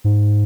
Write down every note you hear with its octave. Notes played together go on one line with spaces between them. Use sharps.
G#2